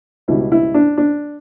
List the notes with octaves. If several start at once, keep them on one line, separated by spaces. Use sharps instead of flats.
C#2 B2 G3 E4
E4
D4
D4